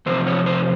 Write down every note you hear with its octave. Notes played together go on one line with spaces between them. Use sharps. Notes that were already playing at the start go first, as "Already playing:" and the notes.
E2 C3 F3 C4 C5
C#5
C5